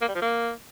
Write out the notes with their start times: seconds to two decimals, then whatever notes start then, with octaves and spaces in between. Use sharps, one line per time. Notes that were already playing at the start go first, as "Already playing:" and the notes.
0.02 A#3
0.08 G3
0.15 F3
0.22 A#3